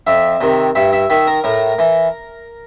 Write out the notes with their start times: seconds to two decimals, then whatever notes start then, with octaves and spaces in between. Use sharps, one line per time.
0.07 F2 E5
0.41 C3 D#3
0.75 G2 E5
0.93 E5
1.10 D#3 E5
1.27 A#4
1.44 A2 A#4
1.79 E3